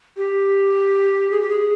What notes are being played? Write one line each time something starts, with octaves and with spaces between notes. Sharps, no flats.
G4
G#4
G4
G#4